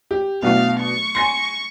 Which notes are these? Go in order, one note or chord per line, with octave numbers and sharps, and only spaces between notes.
G4
B2 F#3 A3 D4 E4 F5
C#6
G#5 C6 A#6 C7